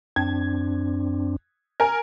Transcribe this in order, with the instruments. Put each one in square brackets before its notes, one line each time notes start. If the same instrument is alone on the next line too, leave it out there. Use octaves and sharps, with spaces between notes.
[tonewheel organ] F#2 C4 D4 [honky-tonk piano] G#6
[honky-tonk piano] A#4 G#5